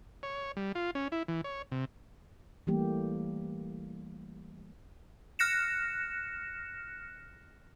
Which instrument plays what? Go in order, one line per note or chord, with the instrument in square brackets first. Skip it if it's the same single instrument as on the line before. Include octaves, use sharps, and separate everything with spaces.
[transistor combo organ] C#5
G3
F4
C#4
E4
E3
C#5
C3
[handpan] E3 G3 A3 A#3 G4
[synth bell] F6 F#6 A#6 C#7 E7